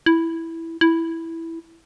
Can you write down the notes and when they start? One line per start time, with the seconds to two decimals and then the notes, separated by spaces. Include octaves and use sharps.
0.06 E4
0.81 E4